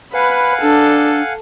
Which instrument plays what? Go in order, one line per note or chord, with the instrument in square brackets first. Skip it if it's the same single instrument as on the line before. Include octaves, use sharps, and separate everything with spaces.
[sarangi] B4 [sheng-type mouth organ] F5 F#5 G#5 [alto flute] B5
[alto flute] D4 [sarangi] A4